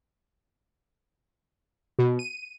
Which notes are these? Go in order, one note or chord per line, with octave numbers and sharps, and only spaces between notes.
B2
D#7